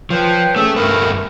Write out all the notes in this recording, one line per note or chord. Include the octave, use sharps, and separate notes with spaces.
F3 B4 C#5 G5
A3 C#4 G#4 E6
G2 A3 A#4 B4